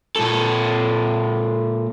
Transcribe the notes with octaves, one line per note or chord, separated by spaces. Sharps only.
A#2 A4